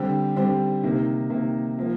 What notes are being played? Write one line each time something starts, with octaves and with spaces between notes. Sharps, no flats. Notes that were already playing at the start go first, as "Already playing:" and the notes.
Already playing: D3 G3 C4 G4
D3 G3 C4 G4
C3 D#3 A#3
C3 D#3 A#3
F3 A#3 F4